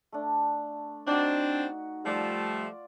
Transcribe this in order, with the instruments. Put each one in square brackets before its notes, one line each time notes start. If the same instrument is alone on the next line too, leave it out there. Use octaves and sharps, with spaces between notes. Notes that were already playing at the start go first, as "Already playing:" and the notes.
[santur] A3 D4
[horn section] C4 D4 [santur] D#4 F#4
[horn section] F3 G3 A3 [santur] F4 D5